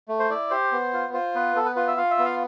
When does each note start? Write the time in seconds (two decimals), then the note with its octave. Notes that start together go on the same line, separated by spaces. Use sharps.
0.09 A3
0.19 C5
0.30 E4 D5
0.51 G4 C5
0.72 B3
0.93 F4
1.13 F4 C5
1.35 B3 B4
1.56 B3 A4
1.66 B4
1.76 F4 B4
1.87 E5
1.97 F4 F5
2.11 E5
2.19 B3
2.25 F5